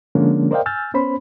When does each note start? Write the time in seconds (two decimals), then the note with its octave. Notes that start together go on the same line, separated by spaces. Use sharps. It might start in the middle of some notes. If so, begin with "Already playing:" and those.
0.15 D3 F3 G#3 A#3 C#4 D4
0.51 A#4 C5 D5 D#5 F5 G5
0.66 G#5 E6 F6 G6 A6
0.94 B3 C#4 C5 B5